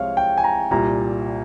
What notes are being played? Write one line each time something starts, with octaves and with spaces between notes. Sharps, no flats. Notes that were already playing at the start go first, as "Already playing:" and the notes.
Already playing: C2 C3 F3 G#3 C#5 F5
G5
G#5
A#5
C2 A#2 G3 A#5